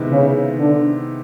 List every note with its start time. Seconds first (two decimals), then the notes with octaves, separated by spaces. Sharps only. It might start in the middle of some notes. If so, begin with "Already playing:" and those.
Already playing: C3 D#3 G#3 B3 E4
0.12 C#3
0.59 D3